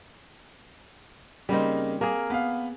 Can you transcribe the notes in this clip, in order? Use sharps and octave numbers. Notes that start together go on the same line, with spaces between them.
C#3 G3 A#3 C4 D#4
A#3 G#4 A#4
B3 F5